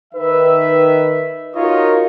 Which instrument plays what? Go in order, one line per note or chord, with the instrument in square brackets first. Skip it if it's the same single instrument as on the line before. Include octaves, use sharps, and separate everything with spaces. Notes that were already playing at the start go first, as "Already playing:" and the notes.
[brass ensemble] D#3 B4 E5
D#4 F4 F#4 A#4 C#5 D#5